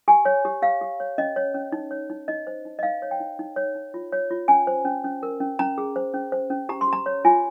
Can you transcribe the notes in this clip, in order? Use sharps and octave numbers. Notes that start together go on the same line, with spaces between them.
G4 G#5
C#5
G4
G4 F5
G4
C#5
C#4 D#5
C#5
C#4
D#4
C#5
D#4
D#4 D#5
C5
D#4
D#5
D#4 F5
C#5
G5
D#4
D#4
C#5
D#4
F4
C#5
F4
C#4 G#5
C5
C#4
C#4
A#4
C#4
C#4 A#5
G#4
C5
C#4
C5
C#4
G4 A#5
C6
G4
A#5
C#5
F4 G#5